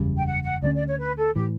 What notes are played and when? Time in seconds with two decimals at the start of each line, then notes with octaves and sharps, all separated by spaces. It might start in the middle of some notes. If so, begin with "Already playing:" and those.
Already playing: F#1 E2 C#3 G3
0.17 G5
0.26 F#5
0.44 F#5
0.62 D2 D3 A3 C#4 D5
0.75 D5
0.87 C#5
0.99 B4
1.17 A4
1.35 A2 E3 G4